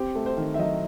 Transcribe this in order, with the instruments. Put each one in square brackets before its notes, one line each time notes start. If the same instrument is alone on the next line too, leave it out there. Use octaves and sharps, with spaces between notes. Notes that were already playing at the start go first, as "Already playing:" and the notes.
Already playing: [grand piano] C4 G4
A3
C5
D#3
E5
F#3 D#5